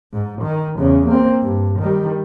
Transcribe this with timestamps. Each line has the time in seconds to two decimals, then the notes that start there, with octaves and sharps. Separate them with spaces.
0.13 G#2
0.42 D#3
0.79 E2 C#3
1.07 A#3 C4
1.42 G2
1.79 D#3 G3